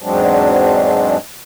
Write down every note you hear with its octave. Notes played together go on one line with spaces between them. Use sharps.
E2 G#2 F#3 G#3 C4 D4